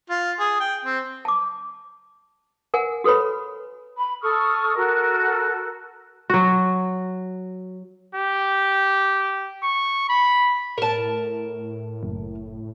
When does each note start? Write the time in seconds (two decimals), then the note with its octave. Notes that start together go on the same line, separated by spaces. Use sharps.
0.10 F4
0.40 G#4
0.60 G5
0.85 C4
1.25 A5 D6
2.74 A#4 F#5 G#5
3.04 F#4 A4 B4 C#5 B5
3.97 B5
4.22 A4 C#6 D#6 F6
4.76 F#4 A4 A#4
6.30 F#3 F#4
8.15 G4
9.63 C#6
10.09 B5
10.78 A2 A#4 A5
12.03 F#1